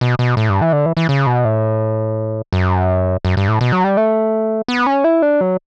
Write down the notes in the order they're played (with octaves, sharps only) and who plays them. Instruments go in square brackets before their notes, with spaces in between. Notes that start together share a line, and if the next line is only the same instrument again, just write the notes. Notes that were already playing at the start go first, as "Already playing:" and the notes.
[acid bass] B2
B2
A2
G2
E3
D3
E3
E3
C#3
B2
A2
F#2
F#2
G2
A2
B2
F#3
G3
A3
B3
C#4
E4
D4
F#3